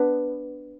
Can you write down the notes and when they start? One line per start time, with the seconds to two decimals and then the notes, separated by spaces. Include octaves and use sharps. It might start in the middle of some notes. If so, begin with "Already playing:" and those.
Already playing: B3 D4